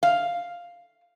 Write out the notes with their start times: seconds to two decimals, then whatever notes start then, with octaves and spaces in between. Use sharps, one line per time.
0.03 F5